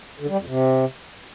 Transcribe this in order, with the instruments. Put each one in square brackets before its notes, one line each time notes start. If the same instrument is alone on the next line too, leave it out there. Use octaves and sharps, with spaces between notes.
[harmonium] D3
G3
F2
C3